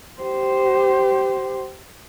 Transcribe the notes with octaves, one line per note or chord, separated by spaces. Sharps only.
G4 C5